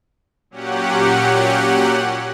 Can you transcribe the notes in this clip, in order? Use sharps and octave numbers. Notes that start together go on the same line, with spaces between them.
A#2 F#3 C#4 G4 F#5